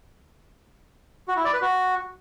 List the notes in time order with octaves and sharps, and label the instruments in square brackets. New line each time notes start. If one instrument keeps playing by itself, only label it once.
[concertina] F#4
E4
D5
B4
F#4